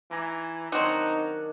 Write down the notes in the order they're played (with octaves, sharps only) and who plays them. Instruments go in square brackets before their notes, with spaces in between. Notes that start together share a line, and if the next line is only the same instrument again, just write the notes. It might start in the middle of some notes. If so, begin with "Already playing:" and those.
[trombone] E3 [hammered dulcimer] G#5 A#5 D6
[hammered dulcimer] D#3 F#3 D4 [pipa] C4 F#4 [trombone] D#4